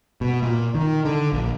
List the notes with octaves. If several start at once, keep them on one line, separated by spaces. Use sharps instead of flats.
B2
A#2
D#3
D3
A#1